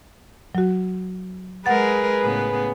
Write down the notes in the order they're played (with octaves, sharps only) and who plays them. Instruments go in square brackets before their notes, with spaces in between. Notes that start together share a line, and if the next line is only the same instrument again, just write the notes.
[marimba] F#3 F#4
[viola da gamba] G#3 A#4 [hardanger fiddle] G#4 B4 [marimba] F#5 A6
[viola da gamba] A2 C#3 B3